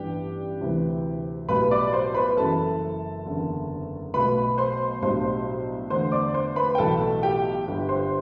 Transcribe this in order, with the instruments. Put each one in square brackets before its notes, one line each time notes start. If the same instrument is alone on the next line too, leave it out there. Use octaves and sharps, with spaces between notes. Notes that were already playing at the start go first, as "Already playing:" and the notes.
Already playing: [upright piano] A1 G2 E3 B3 D4 G4 G5
D2 C3 E3
B1 A2 G3 B4 B5
D5 D6
C5 C6
B4 B5
F#1 F#2 E3 A4 A5
F#1 E2 D3
B1 B2 A3 B4 B5
C5 C6
B1 A2 G3 D4 C5 C6
E2 D3 A3 C5 C6
D5 D6
C5 C6
B4 B5
G5
B1 A2 E3 A3 A4 A5
G4 G5
G1 G2 D3 G3
C5 C6